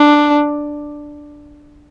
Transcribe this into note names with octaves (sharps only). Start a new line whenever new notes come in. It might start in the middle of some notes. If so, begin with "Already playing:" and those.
Already playing: D4